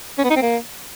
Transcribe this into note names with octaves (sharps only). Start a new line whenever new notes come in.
C#4
B3
D#4
C4
A#3